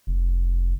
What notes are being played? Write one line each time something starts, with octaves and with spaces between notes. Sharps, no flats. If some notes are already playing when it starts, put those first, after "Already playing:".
F1